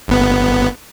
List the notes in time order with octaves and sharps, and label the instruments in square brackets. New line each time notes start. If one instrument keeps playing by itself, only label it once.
[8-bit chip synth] G1 B3